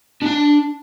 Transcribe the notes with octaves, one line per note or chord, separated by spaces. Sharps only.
D4 A5